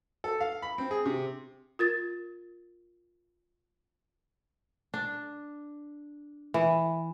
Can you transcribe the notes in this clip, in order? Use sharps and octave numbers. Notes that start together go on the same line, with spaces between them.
A4
F5
B5
C4
G#4
C3
F4 A#4 A6
D4
E3